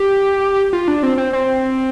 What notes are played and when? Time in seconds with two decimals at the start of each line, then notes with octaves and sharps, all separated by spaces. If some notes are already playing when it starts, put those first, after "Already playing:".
Already playing: G4
0.73 F4
0.88 D4
1.03 C4
1.17 C4
1.33 C4